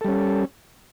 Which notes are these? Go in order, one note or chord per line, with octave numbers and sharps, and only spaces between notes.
G3 C#4 A4